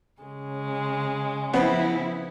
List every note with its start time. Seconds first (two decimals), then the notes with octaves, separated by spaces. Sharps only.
0.21 C#3 G#3
1.53 F3 B3 C4 E4